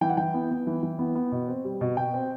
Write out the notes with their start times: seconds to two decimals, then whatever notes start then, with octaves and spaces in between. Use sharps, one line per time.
0.01 E3 G5
0.09 F#5
0.17 E3 G5
0.34 B3
0.51 B3
0.67 E3
0.83 E3
0.99 B3
1.15 B3
1.32 B2
1.48 C4
1.64 G3
1.81 B2
1.97 B2 G5
2.14 C4